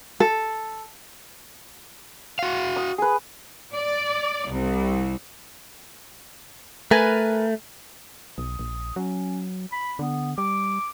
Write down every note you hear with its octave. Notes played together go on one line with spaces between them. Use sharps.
A4
F#4 F5
D#6
G#4 B4
D5
C2
A3 A#4 B4 G#5
B1 D#6
A#1
F#3 C#4
B5
D3 B3
G3 D6